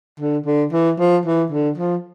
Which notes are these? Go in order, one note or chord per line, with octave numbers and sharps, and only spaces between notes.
D3
D3
E3
F3
E3
D3
F3